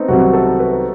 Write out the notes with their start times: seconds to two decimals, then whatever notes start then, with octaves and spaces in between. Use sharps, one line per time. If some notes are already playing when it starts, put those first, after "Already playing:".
Already playing: A3 B3 C4 D#4
0.08 C2 C3 D#3 F#3 F#4
0.33 A4
0.59 B4